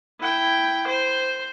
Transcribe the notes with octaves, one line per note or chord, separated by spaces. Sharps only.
E4 G5
C5